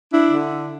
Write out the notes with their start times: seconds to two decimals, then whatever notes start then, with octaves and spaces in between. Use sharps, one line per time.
0.13 D4 E4
0.28 D3